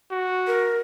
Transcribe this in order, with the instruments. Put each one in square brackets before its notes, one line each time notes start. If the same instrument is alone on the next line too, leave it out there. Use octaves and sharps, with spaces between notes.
[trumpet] F#4
[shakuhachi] A#4